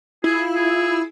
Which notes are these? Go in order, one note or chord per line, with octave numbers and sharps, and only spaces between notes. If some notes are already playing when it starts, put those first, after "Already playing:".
E4 F4 G#4
G#4